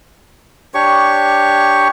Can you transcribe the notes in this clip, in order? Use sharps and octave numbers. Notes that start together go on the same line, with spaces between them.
D4 G4 C#5 C#6